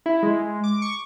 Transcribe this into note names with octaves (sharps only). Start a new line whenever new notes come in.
E4
G#3
D6
C#6